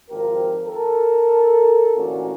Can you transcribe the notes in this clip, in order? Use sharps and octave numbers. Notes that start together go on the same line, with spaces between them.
G#1 F3 G4 A#4
A4 A#4
A1 D2 A#2 A#3 C#4 F#4